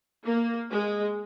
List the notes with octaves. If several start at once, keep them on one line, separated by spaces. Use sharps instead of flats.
A#3
G#3